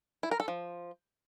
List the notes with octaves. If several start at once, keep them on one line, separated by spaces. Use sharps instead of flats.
E4
A#4
A4
F3